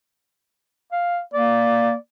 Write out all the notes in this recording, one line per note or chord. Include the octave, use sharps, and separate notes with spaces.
F5
A#3 D5